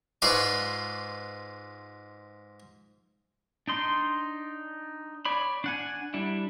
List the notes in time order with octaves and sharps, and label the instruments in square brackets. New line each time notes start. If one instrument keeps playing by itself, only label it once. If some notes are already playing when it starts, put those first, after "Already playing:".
[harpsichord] G#2 F4 B4 D5 C#6 D6
[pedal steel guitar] D4 D#4 C6
C#5 D5 B5
D4 F#5 G#5
G3 D4 E4